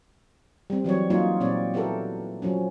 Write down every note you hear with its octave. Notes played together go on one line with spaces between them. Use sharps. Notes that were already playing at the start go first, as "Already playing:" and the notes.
G3 C4
E3 F#3 C4 C#5
F#3 A#3 D#4 F4 C#5
A#2 C4 C#5 D5
B3 E4 F#4 G4 A4 A#4
F3 F#3 C#4